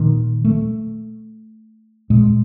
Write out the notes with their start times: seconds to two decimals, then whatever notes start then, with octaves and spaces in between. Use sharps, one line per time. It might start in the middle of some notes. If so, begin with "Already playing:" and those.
Already playing: A#2 D#3
0.45 A3
2.10 A#2 G#3